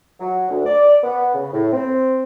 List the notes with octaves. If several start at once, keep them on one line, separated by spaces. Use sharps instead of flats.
F#3
D2
D5
B3
C#3
A2
C4